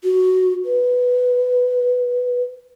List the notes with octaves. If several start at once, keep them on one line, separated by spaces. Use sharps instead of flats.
F#4
B4